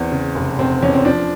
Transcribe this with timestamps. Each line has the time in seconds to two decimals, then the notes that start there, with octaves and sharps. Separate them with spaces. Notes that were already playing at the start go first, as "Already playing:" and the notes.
Already playing: E2 C4
0.12 C#3
0.35 F1
0.59 F1 C4
0.82 E2 C#4
0.94 C4
1.05 F3 D4